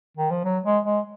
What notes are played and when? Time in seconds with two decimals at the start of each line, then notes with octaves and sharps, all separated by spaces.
0.17 D#3
0.30 F3
0.44 F#3
0.64 G#3
0.85 G#3